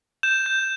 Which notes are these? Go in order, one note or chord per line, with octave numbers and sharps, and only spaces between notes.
G6 E7
G6